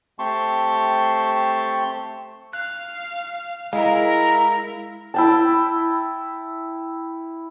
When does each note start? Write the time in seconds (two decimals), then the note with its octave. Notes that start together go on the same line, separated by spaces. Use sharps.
0.19 A3 C4 G4 A5 C6 C#6
2.53 F5 F#6
3.73 G#3 E4 A#4 F5 A#5
5.14 E4 G5 A5